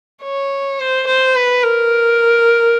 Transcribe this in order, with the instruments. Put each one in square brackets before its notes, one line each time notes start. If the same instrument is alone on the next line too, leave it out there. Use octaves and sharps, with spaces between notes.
[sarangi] C#5
C5
C5
B4
A#4